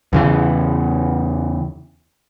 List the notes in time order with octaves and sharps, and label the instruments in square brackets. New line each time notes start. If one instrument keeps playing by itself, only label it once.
[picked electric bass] E2 C#3 E3